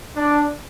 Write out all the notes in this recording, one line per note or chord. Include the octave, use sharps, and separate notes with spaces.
D4